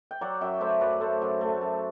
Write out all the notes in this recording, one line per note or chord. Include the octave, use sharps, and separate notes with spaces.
G5
F#3 D5 F#5
F#2 E5 G5
A3 C5 E5
F#2 B4 D5
A3 A4 C5
F#2
A3
F#2